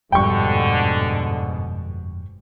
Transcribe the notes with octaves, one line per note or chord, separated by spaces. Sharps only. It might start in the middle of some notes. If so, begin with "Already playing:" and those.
G1 F2 G#2 B2 D3 G3 G5 C#6